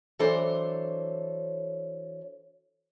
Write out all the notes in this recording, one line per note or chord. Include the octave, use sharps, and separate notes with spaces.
E3 F#3 D4 A4 C5 C#5